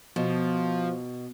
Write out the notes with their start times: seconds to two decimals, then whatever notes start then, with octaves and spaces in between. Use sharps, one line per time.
0.16 B2 F3